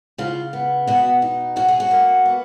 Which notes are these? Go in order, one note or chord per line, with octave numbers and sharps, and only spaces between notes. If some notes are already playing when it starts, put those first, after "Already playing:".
C#3 F4
B3
B2 F#4
D#4
C#4 F#4
G#4
F#4
A#3
B3